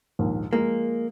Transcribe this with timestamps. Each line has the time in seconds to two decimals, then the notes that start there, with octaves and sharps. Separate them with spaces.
0.19 A#1 D#2 G#2
0.53 F3 G#3 A#3